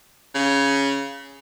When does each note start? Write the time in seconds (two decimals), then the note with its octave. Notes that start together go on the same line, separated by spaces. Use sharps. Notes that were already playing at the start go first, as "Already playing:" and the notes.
0.35 C#3